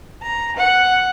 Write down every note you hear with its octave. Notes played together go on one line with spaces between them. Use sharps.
A#5
F#5